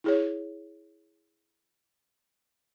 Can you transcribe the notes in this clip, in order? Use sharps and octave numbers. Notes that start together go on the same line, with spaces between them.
E4 G#4 C#5